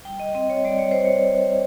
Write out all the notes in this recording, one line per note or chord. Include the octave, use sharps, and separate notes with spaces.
G3 G5
D#5
C4 D#5
C#5
G3 D5
C#5
G3 C5
C#5